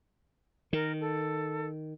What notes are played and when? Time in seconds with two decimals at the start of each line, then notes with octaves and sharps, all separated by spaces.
0.73 D#3 A#4
1.01 A4